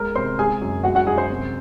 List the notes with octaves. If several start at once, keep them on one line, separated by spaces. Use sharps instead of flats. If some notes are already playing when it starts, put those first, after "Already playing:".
Already playing: G#3 A#4 A#5
C3 C5 C6
G#3 G#4 G#5
F#2
G#3 F#4 F#5
F#4 F#5
F#2 G#4 G#5
C5 C6
C3